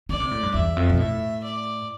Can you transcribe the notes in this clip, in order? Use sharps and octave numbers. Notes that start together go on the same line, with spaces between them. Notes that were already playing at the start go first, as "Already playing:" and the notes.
D3 D5
C3
A2
G2
E2 E5
F2
B2
A2 E5
D5